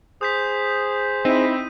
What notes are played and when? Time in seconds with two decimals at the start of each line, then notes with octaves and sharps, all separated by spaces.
0.21 G#4 C5 D#6 G6 B6
1.25 C4 D#4 E4 D#7